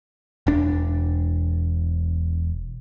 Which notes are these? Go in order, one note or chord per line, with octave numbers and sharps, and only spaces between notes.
E1 D4